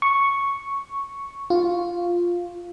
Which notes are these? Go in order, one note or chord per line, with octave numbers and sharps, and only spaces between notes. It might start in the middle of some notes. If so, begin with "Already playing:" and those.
C#6
F4